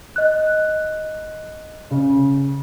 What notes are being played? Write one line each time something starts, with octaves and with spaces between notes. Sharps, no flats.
D#5 F#6
C#3